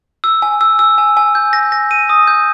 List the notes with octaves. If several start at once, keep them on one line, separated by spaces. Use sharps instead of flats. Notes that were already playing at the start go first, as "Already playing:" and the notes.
E6
G#5
E6
E6
G#5
G#5
G6
A#6
A#6
D#7
D#6
G6